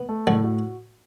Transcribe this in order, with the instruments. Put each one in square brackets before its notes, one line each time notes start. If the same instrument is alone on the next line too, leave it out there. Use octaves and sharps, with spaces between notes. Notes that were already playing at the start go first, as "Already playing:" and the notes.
Already playing: [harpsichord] B3
[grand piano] A3
[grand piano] A2 [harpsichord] D3 F#3
[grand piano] F#4